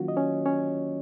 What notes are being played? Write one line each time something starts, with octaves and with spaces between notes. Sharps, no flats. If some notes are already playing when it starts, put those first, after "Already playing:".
Already playing: D#3 F#3 A#3 C#4 F4 F#4
D#5
C#4 C#5
C#4 C#5